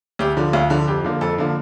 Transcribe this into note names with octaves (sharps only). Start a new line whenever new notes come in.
D2 G4
D3 F3
D2 F4
D3 F3
F2 G4
D3 F3 A#3
F2 A4
D3 F3 A#3